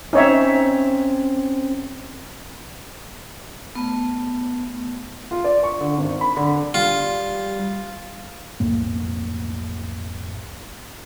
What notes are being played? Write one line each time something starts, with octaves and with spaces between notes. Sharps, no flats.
C4 C#4 D#4 C#5 E5
A3 B3
F4
D5
C#6
D3
G#1
B5
D3
G3 F4
B1 F2 A2 A#3